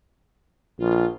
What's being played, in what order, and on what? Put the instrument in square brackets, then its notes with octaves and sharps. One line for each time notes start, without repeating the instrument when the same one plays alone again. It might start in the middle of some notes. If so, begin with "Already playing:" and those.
[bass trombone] A#1 [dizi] F4